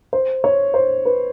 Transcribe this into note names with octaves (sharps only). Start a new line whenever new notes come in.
C5
C#5
C5
B4